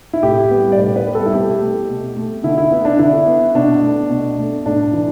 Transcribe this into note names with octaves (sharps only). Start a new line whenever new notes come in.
E4
A2 G4
G3 B3
D5
A2 B4
B4
G3 B3
A4
E4
B2 G4
A3
B2
A3
D3 E4
E4
B3
D4
D3 E4
B3
B2 D4
A3
B2
A3
A2 D4
E3